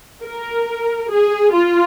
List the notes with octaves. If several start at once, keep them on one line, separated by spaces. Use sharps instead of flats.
A#4
G#4
F4